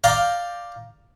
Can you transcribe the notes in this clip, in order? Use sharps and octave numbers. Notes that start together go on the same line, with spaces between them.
D5 F5 G5 A#5